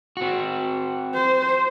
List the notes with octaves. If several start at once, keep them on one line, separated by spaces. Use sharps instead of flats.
C4 F#4
C5